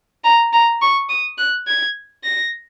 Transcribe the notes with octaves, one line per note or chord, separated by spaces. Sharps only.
A#5
A#5
C#6
D#6
F#6
G#6
A#6